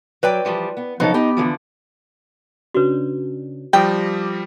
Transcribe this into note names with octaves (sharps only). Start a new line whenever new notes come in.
F#3 B4 D5 G5
E3 F3 G3
B3
C#3 F3 F#3 B3 D#4 A4
B3 D#4 G4
D3 E3 F3
C#3 C#4 D4 F#4 B4
F3 G3 G5 D6 D#6 A#6